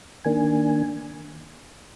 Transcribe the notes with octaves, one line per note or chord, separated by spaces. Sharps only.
D#3 A#3 D4 G#5